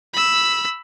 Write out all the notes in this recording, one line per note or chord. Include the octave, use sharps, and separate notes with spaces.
B5 E6